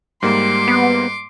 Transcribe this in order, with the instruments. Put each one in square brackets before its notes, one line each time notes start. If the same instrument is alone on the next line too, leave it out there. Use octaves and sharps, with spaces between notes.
[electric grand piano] G#2 G3 A#3 [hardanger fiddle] C6 D6
[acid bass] B3